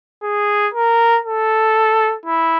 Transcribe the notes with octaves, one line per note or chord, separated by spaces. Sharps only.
G#4
A#4
A4
E4